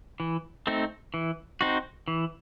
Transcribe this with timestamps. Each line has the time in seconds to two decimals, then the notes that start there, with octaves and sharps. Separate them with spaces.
0.20 E3
0.67 A3 C4 D#4
1.14 E3
1.61 C4 D#4 F#4
2.08 E3